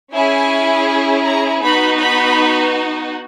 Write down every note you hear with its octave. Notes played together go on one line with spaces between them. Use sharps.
C#4 E4 G#4 G#5
A#5
B3 D#4 F#4 B5
B5